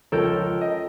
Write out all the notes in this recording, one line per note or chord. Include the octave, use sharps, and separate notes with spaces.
C#2 F3 A4 A#4 C#5 G5
D#5